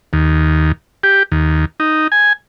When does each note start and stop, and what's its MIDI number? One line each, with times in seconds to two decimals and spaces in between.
0.13 0.72 39
1.03 1.23 67
1.32 1.65 39
1.80 2.07 63
2.12 2.33 80